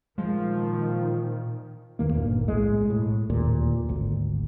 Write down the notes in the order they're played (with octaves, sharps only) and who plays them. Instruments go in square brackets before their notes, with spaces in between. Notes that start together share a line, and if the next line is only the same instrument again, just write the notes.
[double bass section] A#2 D#3 [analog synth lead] F3 [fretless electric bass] G#3
[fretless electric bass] E2 D#3 A#3
G1 D2 A#2
B1 A2 G#3
A2
D1 D#2 A#2
G#1 D2